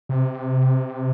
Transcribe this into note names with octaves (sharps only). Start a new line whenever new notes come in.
C3